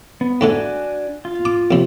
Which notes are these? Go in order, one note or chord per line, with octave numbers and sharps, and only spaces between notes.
B3
G#2 D3 A3 D4 F#4 G#5
F4
D6
A#1 C3